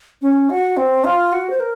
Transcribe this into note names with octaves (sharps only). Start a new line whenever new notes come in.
C#4
F#4
C4
F4
F#4
C5
A#4